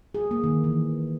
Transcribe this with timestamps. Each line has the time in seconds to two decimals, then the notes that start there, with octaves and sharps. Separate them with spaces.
0.15 G#4
0.31 A#3
0.44 D#3
0.64 E3